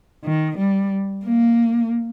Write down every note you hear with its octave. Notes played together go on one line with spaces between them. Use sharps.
D#3
G3
A#3